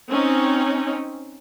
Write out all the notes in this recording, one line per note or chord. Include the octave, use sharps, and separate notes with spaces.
C4 C#4 D#4